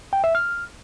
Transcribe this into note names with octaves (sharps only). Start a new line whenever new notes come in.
G5
E5
F6